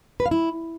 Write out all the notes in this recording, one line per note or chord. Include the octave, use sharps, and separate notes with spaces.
B4
F5
E4